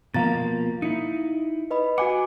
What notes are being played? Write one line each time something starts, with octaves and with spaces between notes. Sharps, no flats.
B2 F3 A#3 F5 A#5 A6
D#4 E4 C#7
B4 D#5 B5
F#4 F#5 G#5 D6